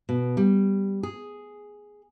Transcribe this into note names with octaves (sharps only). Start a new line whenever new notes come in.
B2
G3
G#4